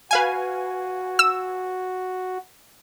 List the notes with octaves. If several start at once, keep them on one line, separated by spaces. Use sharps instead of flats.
F#4 B4 F5 G#5
E6